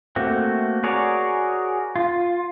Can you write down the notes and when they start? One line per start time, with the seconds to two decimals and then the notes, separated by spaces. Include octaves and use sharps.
0.16 A3 A#3 C4 F#4
0.83 F#4 G#4 A#4 C#5 D5
1.96 F4